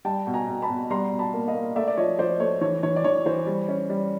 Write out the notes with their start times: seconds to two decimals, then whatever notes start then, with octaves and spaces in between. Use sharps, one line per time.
0.05 G3 G5 A5
0.27 B2
0.34 G#5 A#5
0.48 B2
0.62 A5 B5
0.69 B2
0.90 G3 A#5 C6
1.12 B2
1.19 A5 B5
1.34 A#3
1.48 D#5 F5
1.54 A#3
1.76 A3 D5 E5
1.88 D5
1.97 F3 C#5 D#5
2.19 F3 C5 D5
2.40 A3 C#5
2.61 E3 C#5
2.83 E3 C#5
2.96 D5
3.04 E3 C#5
3.26 E3 C5
3.47 G3
3.68 C#4
3.89 G3